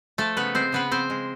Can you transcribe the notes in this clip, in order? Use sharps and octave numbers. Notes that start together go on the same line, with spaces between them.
F3 A3 A4
C#3 B3 B4
G#3 C4 C5
C#3 B3 B4
F3 C4 C5
G#3